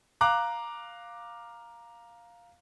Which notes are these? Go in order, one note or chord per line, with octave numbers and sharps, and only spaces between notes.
F5 A#5 D6 F#6